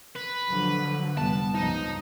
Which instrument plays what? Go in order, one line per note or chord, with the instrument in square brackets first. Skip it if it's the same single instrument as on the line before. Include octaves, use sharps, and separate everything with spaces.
[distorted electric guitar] B4
[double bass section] D3 F3 F#3
[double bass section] F1 G3 B3 [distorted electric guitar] A5
[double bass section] C#2 G2 F3 [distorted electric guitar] D#4